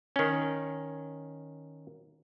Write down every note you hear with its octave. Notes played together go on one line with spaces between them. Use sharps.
D#3 C#4